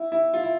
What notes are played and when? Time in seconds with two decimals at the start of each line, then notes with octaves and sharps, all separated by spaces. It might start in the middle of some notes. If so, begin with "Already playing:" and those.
Already playing: E4
0.12 E4
0.34 F4
0.43 E4